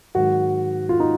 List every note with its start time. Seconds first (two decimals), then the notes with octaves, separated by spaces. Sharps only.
0.15 G#2 D#3 F#3 F#4
0.89 F4
1.00 D#4